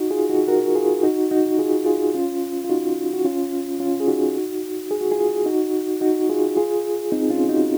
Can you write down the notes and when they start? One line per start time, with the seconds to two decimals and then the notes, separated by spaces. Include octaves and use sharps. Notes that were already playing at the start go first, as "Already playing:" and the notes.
Already playing: D#4 F#4
0.10 F4 G#4
0.30 D#4 F#4
0.48 F#4 A#4
0.75 F4 G#4
1.03 D#4 F#4
1.31 D#4 F#4
1.58 F4 G#4
1.86 F4 G#4
2.14 C#4 F4
2.64 F4
2.69 D#4 F#4
3.13 F#4
3.25 C#4 F4
3.80 C#4 F4
4.00 G#4
4.08 D#4 F#4
4.91 G#4
5.01 F#4
5.11 F4 G#4
5.46 D#4 F#4
6.01 D#4 F#4
6.29 F4 G#4
6.57 F4 G#4
7.12 C4 D#4
7.30 C#4 F4
7.49 D#4 F#4